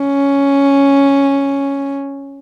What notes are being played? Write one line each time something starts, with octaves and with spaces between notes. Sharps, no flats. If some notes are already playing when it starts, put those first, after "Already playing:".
Already playing: C#4